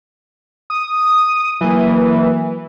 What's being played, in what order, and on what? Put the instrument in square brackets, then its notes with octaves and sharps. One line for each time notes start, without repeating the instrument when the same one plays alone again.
[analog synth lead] D#6
[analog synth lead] E3 [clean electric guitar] F#3 A#3